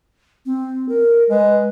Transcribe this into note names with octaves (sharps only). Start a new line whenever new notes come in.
C4
A#4
G#3 B4